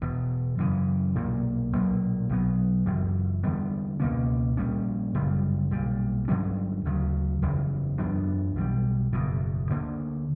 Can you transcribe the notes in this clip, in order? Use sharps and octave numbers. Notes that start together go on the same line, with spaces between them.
E1 E2 B2
F#2 C#3 E3
B1 A#2 A#3
B1 A#2 F#3 A#3
B1 B2 F#3 B3
F#1 F#2 E3
E2 D3 G3 B3
C#2 B2 A#3 C#4
A#1 A#2 G3 C#4
G1 F#2 C#3 G3
B1 A#2 G3
G2 D3 F#3 C#4
D2 C#3 F#3
F#1 E2 C#3 E3
F#2 E3 B3 D4
B1 B2 G3
F#1 E2 B2
D2 D3 A#3